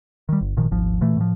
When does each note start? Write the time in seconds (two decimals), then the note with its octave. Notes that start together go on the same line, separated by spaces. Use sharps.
0.29 D#3 G3
0.41 G1
0.57 G#1 A#2 D#3 F3
0.71 D#1 G#1 F3
1.01 A#2 E3 A3
1.17 A2 F3